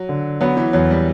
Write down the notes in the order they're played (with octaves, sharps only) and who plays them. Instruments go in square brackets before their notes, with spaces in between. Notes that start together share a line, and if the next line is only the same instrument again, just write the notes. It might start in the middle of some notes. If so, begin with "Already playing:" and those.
Already playing: [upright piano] F#3
[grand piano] D3
[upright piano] F#3 [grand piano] B3
[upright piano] E3
[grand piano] E2 [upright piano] F#3
[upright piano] G3